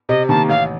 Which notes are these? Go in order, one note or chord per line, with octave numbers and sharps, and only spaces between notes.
C3 D#5
D#3 A#3 A5
A1 F5